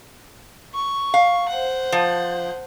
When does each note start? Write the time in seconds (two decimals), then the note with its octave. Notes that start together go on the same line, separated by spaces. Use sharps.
0.74 C#6
1.14 F5
1.49 C5 F#5
1.92 F3